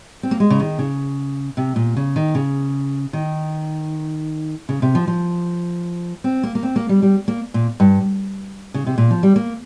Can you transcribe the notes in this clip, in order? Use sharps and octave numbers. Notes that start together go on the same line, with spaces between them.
C4
A#3
G#3
C#3
D#3
C#3
C3
A#2
C#3
D#3
C#3
D#3
C#3
C3
F3
F3
C4
A#3
A#3
C4
A#3
G3
G3
A#3
A#2
G2
C#3
C3
A#2
F3
G3
A#3